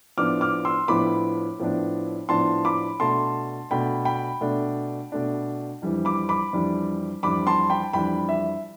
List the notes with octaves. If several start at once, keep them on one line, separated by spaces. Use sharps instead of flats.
A2 F3 B3 D4 D6 F6
D6 F6
C6 E6
A2 F3 B3 D4 B5 D6
A2 F3 B3 D4
A2 F3 B3 D4 A5 C6
B5 D6
B2 A3 D4 A5 C6
B2 A3 D4 G5 B5
G5 B5
B2 A3 D4
B2 A3 D4
F2 E3 G3 D4
B5 D6
B5 D6
F2 E3 G3 D4
F2 E3 G3 D4 B5 D6
A5 C6
G5 B5
F2 E3 G3 D4 G5 B5
E5